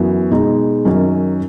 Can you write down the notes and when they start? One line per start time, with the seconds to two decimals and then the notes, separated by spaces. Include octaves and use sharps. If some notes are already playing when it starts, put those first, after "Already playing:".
Already playing: F#2 E3 B3 F#4
0.31 B2 G#3 D#4
0.85 F#2 D#3 F#3 C#4